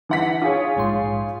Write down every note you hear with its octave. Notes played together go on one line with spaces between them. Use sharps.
E3 F#5 B6
F4 G#4 C#5
A#1 G#2 C6